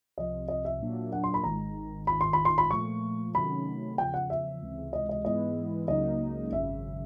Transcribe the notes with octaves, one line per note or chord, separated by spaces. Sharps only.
C2 C3 F3 D#5
D#5
E5
A#2 F#3 A#3 D4
F#5
C6
B5
G#1 G#2 D#3 A#5
G#1 G#2 D#3 B5
C6
B5
C6
B5
A#2 F3 A3 C#6
C3 D#3 F#3 A3 C#4 B5
E2 C#3 F3 G5
F#5
E5
C#2 C3 E3 G#3
D#5
D#5
G#2 E3 G#3 B3 E4 D#5
C#2 C#3 F#3 A#3 D#4 D#5
G#1 F#2 C#3 E5